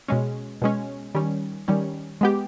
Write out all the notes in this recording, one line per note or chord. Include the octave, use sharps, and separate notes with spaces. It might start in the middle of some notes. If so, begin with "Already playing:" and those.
B2 G#3 C#4
B2 G#3 C#4
D#3 G3 C#4
D#3 G3 C#4
G#3 B3 G4